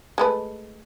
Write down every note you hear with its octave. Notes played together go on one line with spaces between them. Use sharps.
G#3 A3 B4